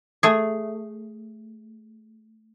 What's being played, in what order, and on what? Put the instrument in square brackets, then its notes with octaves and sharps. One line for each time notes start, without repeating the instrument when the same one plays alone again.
[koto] A3 G#4